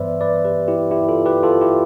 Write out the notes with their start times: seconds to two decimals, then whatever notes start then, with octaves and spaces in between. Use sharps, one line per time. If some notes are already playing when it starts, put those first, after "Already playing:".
Already playing: G2 E3 G3 B3 B4 C5 D5 E5
0.21 B4 D5
0.45 G4 B4
0.68 E4 G4
0.91 E4 G4
1.09 F4 A4
1.25 G4 B4
1.43 F4 A4
1.61 E4 G4